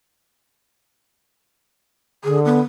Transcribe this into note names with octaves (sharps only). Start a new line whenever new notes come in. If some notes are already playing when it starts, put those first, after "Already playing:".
D3 G#4
B3